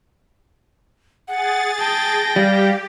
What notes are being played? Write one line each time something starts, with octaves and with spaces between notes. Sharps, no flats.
G#4 F#5 A6
G5 A5 A#6
G3 G4 F5